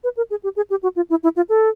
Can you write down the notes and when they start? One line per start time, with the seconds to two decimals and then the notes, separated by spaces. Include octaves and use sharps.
0.04 B4
0.17 A#4
0.30 G#4
0.43 G4
0.56 G#4
0.70 G4
0.83 F#4
0.96 F4
1.10 E4
1.23 E4
1.36 F4
1.49 A4